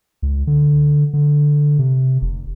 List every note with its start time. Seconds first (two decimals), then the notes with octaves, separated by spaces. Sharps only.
0.22 C#2
0.47 D3
1.13 D3
1.79 C3
2.22 F1